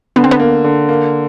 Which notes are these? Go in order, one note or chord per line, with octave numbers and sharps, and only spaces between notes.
D3 B3
C4
B3
A#3
D3
A#3